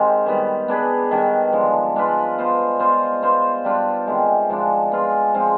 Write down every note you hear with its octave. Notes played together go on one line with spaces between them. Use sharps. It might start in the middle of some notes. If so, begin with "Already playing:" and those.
Already playing: D#3 G#3 C4 G4
D#3 G3 B3
B3 D4 G#4 B4
D#3 G3 D4
D3 F3 G#3
G#3 D4 F4 B4
B3 F4 C5
B3 F4 C5
B3 F4 C5
G3 D4 F4
C3 D#3 G#3
F3 G#3 D4
B3 F4 G#4
F3 G#3 C4 F4